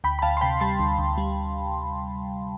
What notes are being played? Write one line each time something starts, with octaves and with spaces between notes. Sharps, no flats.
D2 G5 B5
B5
D2 F5 A5
C6
C3 G5 B5
G3 A5 C6
D2
D2
G3